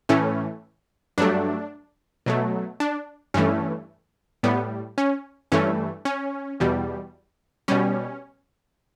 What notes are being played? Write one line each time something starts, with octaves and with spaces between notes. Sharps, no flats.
A2 E3 A3 C#4
G2 F#3 A3 D4
B2 F#3 A3
D4
G2 E3 A3 C#4
A2 G3 B3
C#4
G2 E3 A3 C#4
C#4
E2 B2 G3
B2 G3 C#4